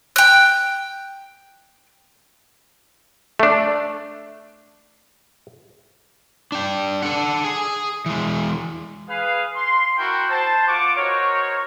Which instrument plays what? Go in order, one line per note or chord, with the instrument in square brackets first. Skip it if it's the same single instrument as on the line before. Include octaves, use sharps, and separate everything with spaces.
[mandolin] G5 F#6
[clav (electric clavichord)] A3 D4
[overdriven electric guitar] D4 G5
A4 F#5
G#4
E3 G#3
[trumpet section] G#4 B4 F5
C6
E4 F#4 A#4 G5 C6 C#6
C5 A5
A3 F4 F#5 C#6 D6
D#4 F#4 A#4 C5 C#5